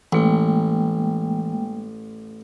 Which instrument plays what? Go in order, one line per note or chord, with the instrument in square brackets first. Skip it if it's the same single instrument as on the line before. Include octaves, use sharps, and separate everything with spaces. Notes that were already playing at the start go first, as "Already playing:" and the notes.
[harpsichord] A1 [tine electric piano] E3 [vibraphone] G#3 A#3 G5